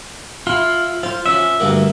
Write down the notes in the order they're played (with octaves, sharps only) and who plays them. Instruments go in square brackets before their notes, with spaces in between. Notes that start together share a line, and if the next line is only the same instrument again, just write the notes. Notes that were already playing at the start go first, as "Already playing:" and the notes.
[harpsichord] E4 [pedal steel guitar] F4
[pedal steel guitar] F4 [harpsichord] C5 C6
[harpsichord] F3 C#4 [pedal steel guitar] E5
[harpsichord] D2 G2 A#3